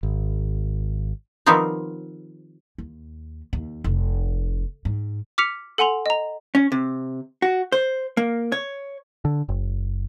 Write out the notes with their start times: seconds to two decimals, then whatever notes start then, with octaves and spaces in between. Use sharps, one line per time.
0.03 G#1
1.46 D#3 F3 G3 B3 C4 D#4
2.78 D#2
3.53 D#2
3.84 F1
4.85 G#2
5.38 D6 F6 B6 C#7 F7
5.78 A4 F#5 G#5 C6 F7
6.06 D#5 A#5
6.55 C#4
6.72 C3
7.42 F#4
7.72 C5
8.17 A#3
8.52 C#5
9.25 D3
9.49 F#1